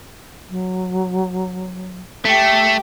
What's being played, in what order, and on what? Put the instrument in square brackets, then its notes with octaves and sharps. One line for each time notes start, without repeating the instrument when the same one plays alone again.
[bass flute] F#3
[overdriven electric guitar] A3 [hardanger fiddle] G4